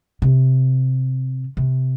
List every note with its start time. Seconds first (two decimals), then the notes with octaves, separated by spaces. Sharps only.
0.22 C3
1.57 C3